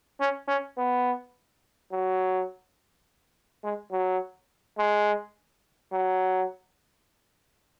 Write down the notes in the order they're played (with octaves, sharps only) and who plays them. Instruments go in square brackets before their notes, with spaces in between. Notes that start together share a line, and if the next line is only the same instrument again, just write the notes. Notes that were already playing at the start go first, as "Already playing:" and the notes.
[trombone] C#4
C#4
B3
F#3
G#3
F#3
G#3
F#3